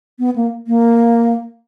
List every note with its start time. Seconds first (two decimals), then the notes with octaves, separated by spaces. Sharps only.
0.19 B3
0.36 A#3
0.67 A#3